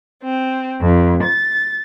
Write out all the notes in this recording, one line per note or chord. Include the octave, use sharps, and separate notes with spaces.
C4
F2
A6